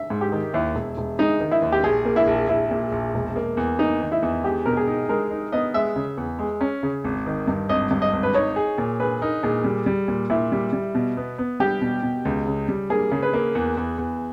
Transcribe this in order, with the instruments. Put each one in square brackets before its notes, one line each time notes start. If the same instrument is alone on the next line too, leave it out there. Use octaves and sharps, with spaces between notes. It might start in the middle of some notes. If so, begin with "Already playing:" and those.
Already playing: [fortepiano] E5
[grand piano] G#2
[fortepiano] G4
[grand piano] D#3
[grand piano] D#2 [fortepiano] E4
[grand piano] E1
E1
[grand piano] G#3 [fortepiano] D#4
[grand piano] D#3
[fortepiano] E4
[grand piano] D#2
[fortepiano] G4
[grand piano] A#1 [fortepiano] G#4
[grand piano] A#3
[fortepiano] E4
[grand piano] A#1
[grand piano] A#1 [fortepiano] E4
[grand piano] A#2
A#1
E1
A#3
E2
[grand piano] A#3 [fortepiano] D#4
[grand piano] D#3
[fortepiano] E4
[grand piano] E2
[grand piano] G#3 [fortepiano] G4
[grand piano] B2 [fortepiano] A#4
[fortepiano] G#4
[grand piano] D#4
[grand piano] G#3 [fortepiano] A#4
[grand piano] D#4
[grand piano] B3 [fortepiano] D#5
[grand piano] G#3 [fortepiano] E5
[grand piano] C#3
E2
G#3
C#4
C#3
G#1
D#3
G2
[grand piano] G#1 [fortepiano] D#5
[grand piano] G2
[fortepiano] D#5
[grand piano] G#1
[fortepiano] B4
[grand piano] D#4 [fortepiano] C#5
[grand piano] G#4
A#2
[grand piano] G#4 [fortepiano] B4
[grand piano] D#4 [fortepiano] A#4
[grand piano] A#2 [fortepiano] G#4
[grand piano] G3
G3
A#2
[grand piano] A#2 [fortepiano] E4
[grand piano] G3
G3
B2
B3
B3
[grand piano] G3 [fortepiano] G4
[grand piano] B2
B2
C#2
C#3
G3
[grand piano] A#3 [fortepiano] G#4
[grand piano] C#3
[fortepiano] B4
[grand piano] A#3
E2
E2
E2